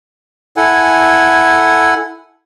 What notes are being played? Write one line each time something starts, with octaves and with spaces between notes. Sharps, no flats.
E4 A4 F#5 G#5